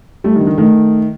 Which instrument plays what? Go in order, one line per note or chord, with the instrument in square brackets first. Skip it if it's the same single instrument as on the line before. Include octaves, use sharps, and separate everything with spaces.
[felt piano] G3 [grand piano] A3
[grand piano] D#3
[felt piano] D3
[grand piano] D#3
[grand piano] D#3 [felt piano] A3